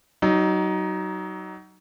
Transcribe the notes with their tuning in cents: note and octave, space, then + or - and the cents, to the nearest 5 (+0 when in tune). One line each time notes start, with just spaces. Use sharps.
F#3 +25 D#4 +0